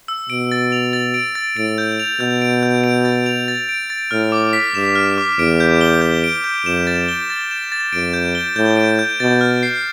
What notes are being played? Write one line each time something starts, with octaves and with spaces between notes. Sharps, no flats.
E6
B2 D7
A6
F7
A6
D7
A6
A2 D7
G6
F7
B2 G6
D7
G6
D7
A6
F7
A6
D7
A6
A2 F6
D6
B6
G2 E7
F6
D6
E2 D7
G6
G7
G6
D7
G6
F2 E7
A6
G7
A6
E7
A6
F2 D7
G6
G7
A2 G6
D7
G6
B2 A6
F6
C7